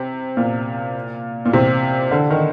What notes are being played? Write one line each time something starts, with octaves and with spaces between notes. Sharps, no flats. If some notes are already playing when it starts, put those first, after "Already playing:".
Already playing: C3
A#2
A#2
C3
D3
D#3